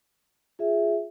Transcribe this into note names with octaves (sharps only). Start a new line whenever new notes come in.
F4 G#4 E5